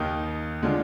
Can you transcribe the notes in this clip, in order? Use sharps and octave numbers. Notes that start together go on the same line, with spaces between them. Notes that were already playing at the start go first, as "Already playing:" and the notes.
Already playing: D#2 D#3 A#3 D#4
D3 G#3 D4 F4